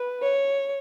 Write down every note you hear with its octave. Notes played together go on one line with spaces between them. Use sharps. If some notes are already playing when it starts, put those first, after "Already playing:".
Already playing: B4
C#5